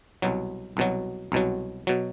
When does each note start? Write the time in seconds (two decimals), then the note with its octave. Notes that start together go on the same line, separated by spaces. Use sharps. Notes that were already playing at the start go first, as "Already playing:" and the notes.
0.22 C2 B2 F#3
0.77 C2 B2 F#3
1.32 C2 B2 F#3
1.87 B2 F#3